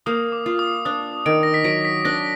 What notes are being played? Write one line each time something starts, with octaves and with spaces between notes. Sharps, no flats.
A#3 D#6
D6
F4
D#6
D4 D#6
D#3 D7
A#6
B6
F#3 D7
B6
D4 A#6